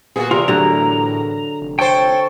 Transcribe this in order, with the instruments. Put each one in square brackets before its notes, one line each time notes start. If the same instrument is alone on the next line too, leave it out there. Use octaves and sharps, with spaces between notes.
[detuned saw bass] A#2 [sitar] B3 F4 F#4 [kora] G#4
[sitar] E2 A#4 [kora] C3 [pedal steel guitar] F4
[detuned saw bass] A2 [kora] D3 F#3 [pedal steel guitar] A#5
[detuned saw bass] F1
[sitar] A4 C5 [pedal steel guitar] C#5 G5